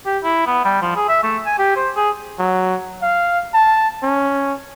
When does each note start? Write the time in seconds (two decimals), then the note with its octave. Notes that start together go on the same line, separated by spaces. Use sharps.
0.06 G4
0.23 E4
0.46 B3
0.65 G3
0.82 F3
0.96 G#4
1.08 E5
1.23 A3
1.46 G#5
1.58 G4
1.76 C5
1.96 G#4
2.39 F#3
3.02 F5
3.54 A5
4.03 C#4